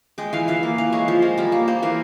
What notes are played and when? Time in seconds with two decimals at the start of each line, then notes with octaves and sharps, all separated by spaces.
0.18 G#3 G5
0.33 E3 F5
0.48 E3 F5
0.63 A#3
0.78 E3 F5
0.92 G#3 C#5
1.08 F3 C5
1.22 G#3 A#4
1.38 G3 A#4
1.52 A#3
1.68 A#3 C5
1.83 E3 A#4